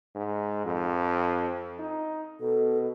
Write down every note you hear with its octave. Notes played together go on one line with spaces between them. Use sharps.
G#2
F2
D#4
B2 A4